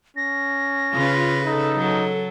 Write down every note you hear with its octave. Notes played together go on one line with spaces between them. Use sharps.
C#4 A#6
C#3 F4 B4
D#4 A4
F#3